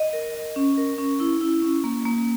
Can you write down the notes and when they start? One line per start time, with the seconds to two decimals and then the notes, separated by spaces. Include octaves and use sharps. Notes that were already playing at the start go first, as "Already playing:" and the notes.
Already playing: D#5
0.13 A#4
0.34 D#5
0.56 C#4
0.77 A#4
0.98 C#4
1.20 E4
1.41 E4
1.62 C#4
1.84 A#3
2.05 A#3